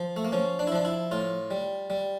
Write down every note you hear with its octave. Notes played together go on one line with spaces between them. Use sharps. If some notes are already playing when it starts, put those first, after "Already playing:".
Already playing: F3
A3
A#3
F3 C#4
D4
E4
F3 D4
E4
A2 F4
G3
G3